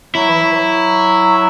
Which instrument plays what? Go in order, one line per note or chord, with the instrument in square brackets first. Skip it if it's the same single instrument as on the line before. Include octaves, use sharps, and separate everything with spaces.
[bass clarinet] F#3 [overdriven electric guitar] E4
[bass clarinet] E3
F#3
E3
F#3